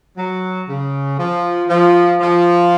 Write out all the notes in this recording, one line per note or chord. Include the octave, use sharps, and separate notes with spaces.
F#3
C#3
F3
F3
F3